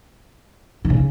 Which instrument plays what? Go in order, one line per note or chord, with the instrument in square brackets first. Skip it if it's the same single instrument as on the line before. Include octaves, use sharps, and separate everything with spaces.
[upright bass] D#3
C#3